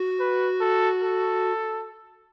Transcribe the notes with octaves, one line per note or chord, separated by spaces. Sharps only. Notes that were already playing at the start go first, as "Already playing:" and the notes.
Already playing: F#4
B4
A4
A4